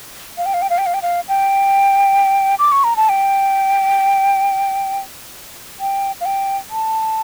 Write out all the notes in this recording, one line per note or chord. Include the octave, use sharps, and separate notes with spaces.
F5
G5
F5
G5
F5
G5
F5
G5
F5
G5
D6
C#6
A#5
A5
G5
G5
F5
G5
A5